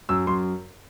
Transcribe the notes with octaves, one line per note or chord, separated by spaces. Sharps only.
F#2 E6
F#2 C6